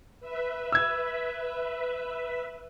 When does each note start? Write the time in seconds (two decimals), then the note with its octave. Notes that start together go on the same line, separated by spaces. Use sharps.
0.20 B4 E5
0.72 E6 G#6